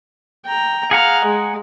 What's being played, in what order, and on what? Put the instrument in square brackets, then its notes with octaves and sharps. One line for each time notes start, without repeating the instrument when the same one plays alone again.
[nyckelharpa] G5 A#5
[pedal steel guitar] G#4 F#5 A#5 [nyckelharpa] F5
[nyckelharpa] G#3